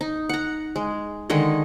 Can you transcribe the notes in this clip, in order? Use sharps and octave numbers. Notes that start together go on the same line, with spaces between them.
D#4
F#5 A#5
G#3
D3 D#3 G#3 D#5